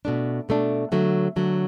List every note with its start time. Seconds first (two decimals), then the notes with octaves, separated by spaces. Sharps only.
0.05 B2 A3 D4
0.49 B2 A3 D4
0.92 D3 F#3 A3
1.36 D3 F#3 A3